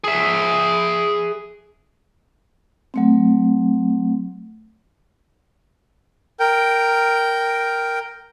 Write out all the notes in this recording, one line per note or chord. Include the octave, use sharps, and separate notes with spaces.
G#4 E5
F#3 A3 C4
A#4 G5